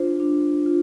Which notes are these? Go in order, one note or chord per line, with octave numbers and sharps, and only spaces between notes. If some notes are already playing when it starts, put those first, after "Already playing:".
Already playing: D4 F4 C5
D4
F4